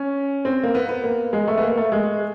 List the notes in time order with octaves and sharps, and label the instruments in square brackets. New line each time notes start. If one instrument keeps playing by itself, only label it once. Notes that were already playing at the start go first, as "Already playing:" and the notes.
Already playing: [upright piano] C#4
C4
A#3
B3
B3
A#3
G#3
A3
B3
A#3
A3
G#3